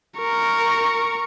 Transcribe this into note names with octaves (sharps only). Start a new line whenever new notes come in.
A#4 C#6